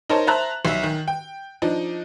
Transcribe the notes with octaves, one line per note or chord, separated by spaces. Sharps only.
D#4 A#4 C5 C#5 A5
C5 E5 A5 A#5 F#6
B1 E5
D#3
G5
F3 D4 D#4